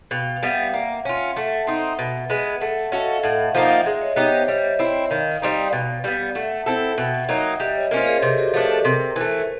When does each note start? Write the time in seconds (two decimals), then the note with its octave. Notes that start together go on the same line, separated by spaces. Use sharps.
0.11 B2 F5 G5
0.36 F5
0.42 G3 B3 E5 F#5
0.74 A#3
1.05 C#4 F4
1.36 A3 E5 F#5
1.67 C4 D#4
1.99 B2
2.30 G#3 B3
2.60 A3 E5 F#5
2.92 C#4 F#4 A4 D#5 F5
3.15 F5
3.23 A2 E5 F#5
3.39 E5 F#5
3.54 F3 A#3 D#4 F5 G5
3.70 E5 F#5
3.85 G#3 D5 E5
4.01 C#5 D#5
4.16 B3 D#4 G4 C#5 D#5
4.33 C5 D5
4.48 G3 C#5 D#5
4.64 D5 E5
4.79 C4 E4
5.10 D#3 F5 G5
5.42 G3 C4 D#4
5.73 B2
6.04 G3 B3
6.35 A3 E5 F#5
6.66 C4 E4 A4
6.92 G5
6.98 B2 E5 F#5
7.29 F#3 A#3 D#4
7.55 D#5
7.60 G3 D5 E5
7.75 C#5 D#5
7.91 A#3 C#4 F4 C5 D5
8.06 G#4 A#4
8.22 C3 G4 A4
8.38 F#4 G#4
8.54 F3 A3 D4 G#4 A#4
8.69 A4 B4
8.84 C3 A#4 C5
9.16 E3 A3